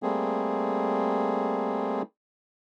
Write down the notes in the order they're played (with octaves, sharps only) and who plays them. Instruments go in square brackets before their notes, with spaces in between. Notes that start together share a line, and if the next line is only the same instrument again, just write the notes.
[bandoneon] G3 A3 A#3 C4 G#4